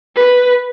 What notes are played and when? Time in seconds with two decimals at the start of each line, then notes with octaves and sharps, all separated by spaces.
0.16 B4